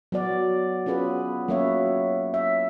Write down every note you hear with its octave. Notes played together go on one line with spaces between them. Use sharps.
F#3 B3 F#4 D5
B3 C#4 F4 G#4 B4
F#3 A#3 C#4 C#5 E5
E5